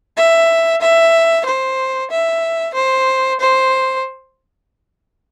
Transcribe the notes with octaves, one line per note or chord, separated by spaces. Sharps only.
E5
E5
C5
E5
C5
C5